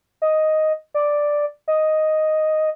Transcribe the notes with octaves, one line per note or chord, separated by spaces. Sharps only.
D#5
D5
D#5